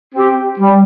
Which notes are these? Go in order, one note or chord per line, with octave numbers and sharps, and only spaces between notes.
C4 G4
G3